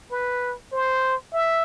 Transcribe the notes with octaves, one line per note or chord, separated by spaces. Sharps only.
B4
C5
E5